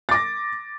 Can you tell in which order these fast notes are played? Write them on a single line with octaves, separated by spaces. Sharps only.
A6 D6 A#6